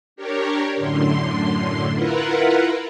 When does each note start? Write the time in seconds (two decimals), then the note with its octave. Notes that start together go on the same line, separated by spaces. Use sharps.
0.16 D4 G4 A#4 C#5
0.76 F#2 A2 D3 C6
1.92 E4 F4 A#4 B4 F#5